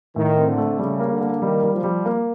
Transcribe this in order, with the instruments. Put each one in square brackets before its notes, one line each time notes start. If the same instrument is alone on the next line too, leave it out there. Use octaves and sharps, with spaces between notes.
[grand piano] A2 [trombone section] D#3
[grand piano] C4
[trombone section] D3
[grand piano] A3
[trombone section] C#3 [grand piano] G3
[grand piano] A#3
[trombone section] D3
[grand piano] A#3
[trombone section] D#3 [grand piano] G3
[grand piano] G3
[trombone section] F3
[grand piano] G3
A#3